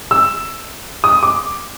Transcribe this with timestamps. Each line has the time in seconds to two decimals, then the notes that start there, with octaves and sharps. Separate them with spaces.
0.11 E6
1.04 D#6
1.23 D6